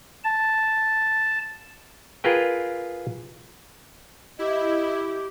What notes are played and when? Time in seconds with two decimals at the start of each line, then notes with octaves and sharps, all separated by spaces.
0.24 A5
2.24 F4 G#4 A#4 B4 G5
4.39 E4 G4 D#5